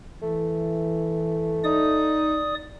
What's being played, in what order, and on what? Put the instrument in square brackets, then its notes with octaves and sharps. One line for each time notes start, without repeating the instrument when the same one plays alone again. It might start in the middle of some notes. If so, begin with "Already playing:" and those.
[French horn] E3 [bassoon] A3
[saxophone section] D#4 [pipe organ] D5 D#6